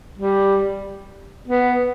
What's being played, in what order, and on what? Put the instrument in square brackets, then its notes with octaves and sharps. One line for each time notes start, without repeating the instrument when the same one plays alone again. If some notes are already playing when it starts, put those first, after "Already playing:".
[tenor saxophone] G3
B3